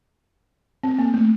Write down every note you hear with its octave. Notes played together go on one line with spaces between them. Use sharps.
C4
A#3
A3